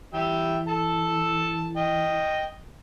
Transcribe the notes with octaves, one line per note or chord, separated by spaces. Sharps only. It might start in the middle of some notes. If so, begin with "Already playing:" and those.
E3 G3 E5 G5
A4 A5
D#5 G5